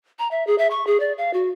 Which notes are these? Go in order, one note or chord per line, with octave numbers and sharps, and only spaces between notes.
A#5
E5
G#4
E5
C#6
G#4
D5
F5
F#4